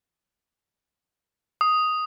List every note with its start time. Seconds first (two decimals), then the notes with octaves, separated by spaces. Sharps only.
1.61 D#6